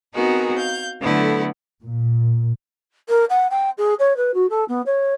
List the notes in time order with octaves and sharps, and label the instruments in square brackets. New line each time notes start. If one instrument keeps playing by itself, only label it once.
[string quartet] B3 C4 D#4 F#4 G#4 A#4
F5 G6
D3 F#3 A3 B3 E4
[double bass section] A#2
[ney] A#4
F#5
G5
G#4
C#5
B4
F#4
A4
B3
C#5